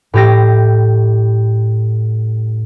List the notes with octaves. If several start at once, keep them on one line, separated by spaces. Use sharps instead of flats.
A2 G4 A#6